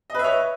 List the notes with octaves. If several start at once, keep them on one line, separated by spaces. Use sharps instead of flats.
B4 C#5 D#5 E5